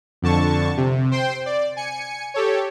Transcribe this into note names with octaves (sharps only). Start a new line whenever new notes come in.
F2 D3 A5 C#6
C3
C5 G5 C6
D5
G#5 C#7
G4 A4 C#5